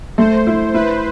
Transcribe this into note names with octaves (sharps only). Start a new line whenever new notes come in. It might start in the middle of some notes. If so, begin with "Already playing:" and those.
A3 C5
E4
E4 B4